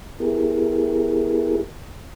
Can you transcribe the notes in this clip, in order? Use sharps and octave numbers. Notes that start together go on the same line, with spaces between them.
B3 E4 G4 G#4 A#4